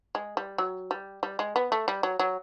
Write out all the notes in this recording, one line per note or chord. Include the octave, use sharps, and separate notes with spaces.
G#3
G3
F#3
G3
G3
G#3
B3
A3
G3
F#3
F#3